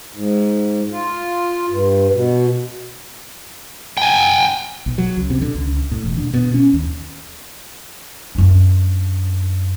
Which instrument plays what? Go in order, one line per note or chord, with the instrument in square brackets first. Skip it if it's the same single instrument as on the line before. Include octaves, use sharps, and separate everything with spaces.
[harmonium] G#2
F4
G2
B2
[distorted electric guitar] G5 G#5
[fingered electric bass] B1
F#3
C#2
C3
D3
C#2
A2
E1
D3
B2
C#4
D#2
[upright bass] F#2 D4